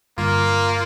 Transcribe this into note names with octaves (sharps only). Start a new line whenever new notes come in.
G2 D3 A#3 F4